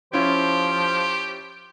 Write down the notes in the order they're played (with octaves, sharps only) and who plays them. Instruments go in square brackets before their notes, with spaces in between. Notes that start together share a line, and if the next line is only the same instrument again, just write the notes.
[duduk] F3 [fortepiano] C#4 E4 F4 [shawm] G4 [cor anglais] C5